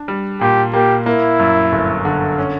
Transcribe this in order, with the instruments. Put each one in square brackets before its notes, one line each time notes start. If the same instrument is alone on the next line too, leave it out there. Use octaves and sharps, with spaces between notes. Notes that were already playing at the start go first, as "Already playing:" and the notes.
Already playing: [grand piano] D4
G3
[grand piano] A#2 [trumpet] G4
[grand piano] A#3 [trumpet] G4
[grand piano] A#3 [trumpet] E4
[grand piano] F#2
G1
D3
C#4